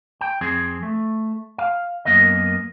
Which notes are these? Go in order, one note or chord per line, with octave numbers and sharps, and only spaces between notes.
G5
F2 C4 G#4
A3
F5
F#2 A#3 B3 D#5